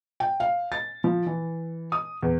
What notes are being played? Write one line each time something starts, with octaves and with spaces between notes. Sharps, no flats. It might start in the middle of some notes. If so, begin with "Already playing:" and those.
G5
F5
A6
F3
E3
D#6
E2